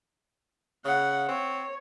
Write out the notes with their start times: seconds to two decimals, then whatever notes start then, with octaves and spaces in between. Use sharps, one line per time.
0.85 C#3 F#5
1.28 C4 C#5